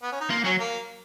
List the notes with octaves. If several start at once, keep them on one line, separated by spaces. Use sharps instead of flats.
B3
C#4
D#4
A#3 F4
F#3 C#4
A#3